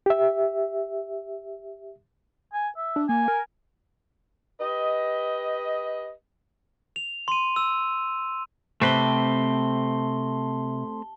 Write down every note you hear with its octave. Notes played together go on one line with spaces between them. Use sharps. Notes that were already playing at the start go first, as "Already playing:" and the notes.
G4 E5
G#5
E5
D4
A#3 G#5
A#4
G4 B4 D#5
F7
C6 D#7
E6
C3 A3 C4 B4 A5 G7